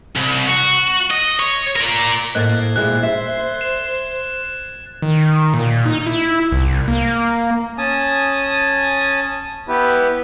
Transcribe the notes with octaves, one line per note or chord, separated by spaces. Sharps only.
C2
F#4
D#5
C#5
A#4 D5
A2 A#3 C5 D#5 F#6 G#6 A6
A#2 G#3 E4 F#6
E5
E7
D#3
A#2
D#4
E4
C2
A#3
C#4 G#5 A5 D#6
B3 E4 G4 B4